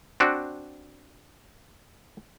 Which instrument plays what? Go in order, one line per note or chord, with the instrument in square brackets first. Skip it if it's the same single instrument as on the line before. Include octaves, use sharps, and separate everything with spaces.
[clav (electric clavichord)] C4 D4 F#4